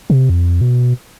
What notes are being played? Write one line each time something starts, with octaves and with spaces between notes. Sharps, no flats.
C3
F2
B2